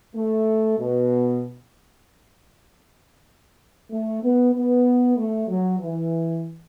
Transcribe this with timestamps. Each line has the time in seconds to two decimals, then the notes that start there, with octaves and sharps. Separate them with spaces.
0.15 A3
0.78 B2
3.91 A3
4.23 B3
4.54 B3
5.17 A3
5.48 F#3
5.80 E3